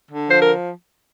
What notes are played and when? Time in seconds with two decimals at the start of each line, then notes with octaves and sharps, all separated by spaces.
0.10 D3
0.29 F3 C5
0.42 A#4